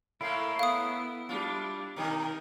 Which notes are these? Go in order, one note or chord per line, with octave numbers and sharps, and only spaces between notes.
A2 A3 A#3 E4 F5 C6
B3 F5 D#6
G3 D4 F4
B2 D#3 D#4 A#4